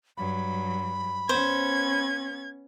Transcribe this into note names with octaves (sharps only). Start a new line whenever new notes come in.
G2 F#3 B5
B3 C#4 C5 G#6